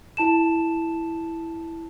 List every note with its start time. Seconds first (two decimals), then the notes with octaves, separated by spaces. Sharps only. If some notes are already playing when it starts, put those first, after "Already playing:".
0.17 E4 A5 E7